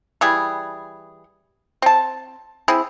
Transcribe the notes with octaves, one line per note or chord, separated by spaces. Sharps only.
E3 G3 G#4
C4 A5
C4 E4 G#4